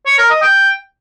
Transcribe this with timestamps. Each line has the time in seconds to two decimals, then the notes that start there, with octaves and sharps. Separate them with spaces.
0.06 C#5
0.18 A#4
0.30 D#5
0.42 G5